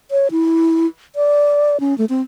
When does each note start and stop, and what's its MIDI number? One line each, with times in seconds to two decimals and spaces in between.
0.11 0.28 73
0.31 0.86 64
1.16 1.80 74
1.80 1.97 61
1.98 2.05 57
2.09 2.21 60